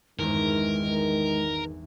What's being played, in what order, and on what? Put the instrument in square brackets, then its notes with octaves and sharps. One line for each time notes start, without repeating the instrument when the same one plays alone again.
[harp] G#1 E2 G2 [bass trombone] D#3 [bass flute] G#3 [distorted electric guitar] A#4